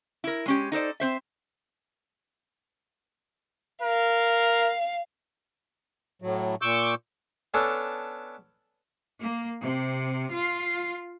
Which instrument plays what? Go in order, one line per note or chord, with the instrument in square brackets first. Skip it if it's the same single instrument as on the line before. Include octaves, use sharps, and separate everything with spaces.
[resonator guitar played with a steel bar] E4 A#4
G#3 C#4 G4
D#4 A4 C5 D5
C4 C5 E5
[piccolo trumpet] A#4 [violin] F5
[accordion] A2 F#3
A#2 C#6 D6 E6 G6
[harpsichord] B3 C#4 D4 A4
[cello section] A#3
C3
F4